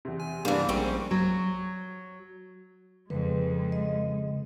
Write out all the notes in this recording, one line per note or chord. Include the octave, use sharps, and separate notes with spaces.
E2 C3
G#5
G2 E3 G3 A#3 B3 D4 F5
A#1 G3 G#3 A#3 C4 C#4
F#3
F2 C#3 G#3 B4
D#5